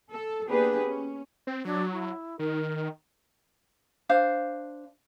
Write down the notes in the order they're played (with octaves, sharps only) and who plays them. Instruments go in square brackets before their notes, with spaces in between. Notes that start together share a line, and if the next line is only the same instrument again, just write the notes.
[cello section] A4
A#3 B3 D4 G4 G#4 B4
C#4
[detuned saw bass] C4
[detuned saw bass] F#3 [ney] D4
[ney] E4
[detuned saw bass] D#3 [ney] A#4
[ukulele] D4 C5 F5